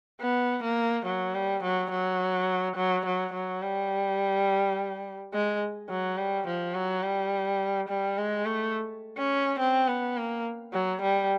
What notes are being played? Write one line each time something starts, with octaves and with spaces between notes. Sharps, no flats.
B3
A#3
F#3
G3
F#3
F#3
F#3
F#3
F#3
G3
G#3
F#3
G3
F3
F#3
G3
G3
G#3
A3
C#4
C4
B3
A#3
F#3
G3